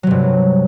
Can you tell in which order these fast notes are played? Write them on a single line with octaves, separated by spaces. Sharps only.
F#3 C3 G2